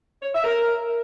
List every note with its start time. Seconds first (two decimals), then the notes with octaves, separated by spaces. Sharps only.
0.22 C#5
0.33 E5
0.44 A#4